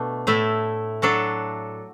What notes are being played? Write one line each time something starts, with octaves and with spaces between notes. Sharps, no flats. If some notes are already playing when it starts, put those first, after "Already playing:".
Already playing: B2 A3 D4
A2 A3 E4
F#3 D4 F#4 A4